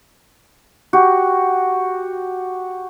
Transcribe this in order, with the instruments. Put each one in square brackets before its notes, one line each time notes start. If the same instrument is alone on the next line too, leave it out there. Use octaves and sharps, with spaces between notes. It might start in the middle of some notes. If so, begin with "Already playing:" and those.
[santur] F#4 G4